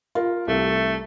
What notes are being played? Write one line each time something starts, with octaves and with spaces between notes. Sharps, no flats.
F4 A#4
C2 A3